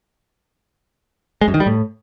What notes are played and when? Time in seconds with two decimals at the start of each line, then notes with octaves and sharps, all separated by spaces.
1.41 G#3
1.48 F#2
1.54 D#3
1.60 G3
1.67 A2